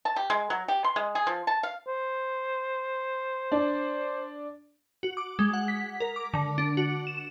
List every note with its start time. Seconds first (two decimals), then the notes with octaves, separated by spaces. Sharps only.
0.05 A5
0.16 G4
0.30 G#3
0.50 F#3
0.68 G4
0.84 C6
0.96 G#3
1.15 G#4
1.27 F3
1.47 A5
1.63 F5
1.87 C5
3.52 D4
5.03 F#4
5.17 D6
5.39 G#3
5.54 F#5
5.68 B6
6.00 A#4
6.16 D6
6.34 D3
6.58 D4
6.77 F#4
7.07 E7